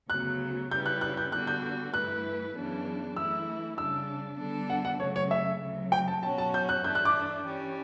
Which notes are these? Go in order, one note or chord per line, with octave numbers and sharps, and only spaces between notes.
D2 C#3 F#3 B3 F#6
C#3 G3 C#4 E4 B4 G6
F#6
F#6
G6
D3 G3 B3 D4 F#4 F#6
G6
G2 E3 A3 E4 B4 F#6
F#2 C#3 E3 B3 D4
E3 A3 E4 E6
C#3 G3 D4 E6
D3 G3 B3 D4 A4
F#5
F#5
C#3 F#3 A3 C#5
C#5
E5
D2 C#3 F#3
G5
A5
B2 F#3 C#4 F#4 A5
A5
G6
F#6
G2 E3 A3 D4 G6
F#6
D6
E3 G3 C#4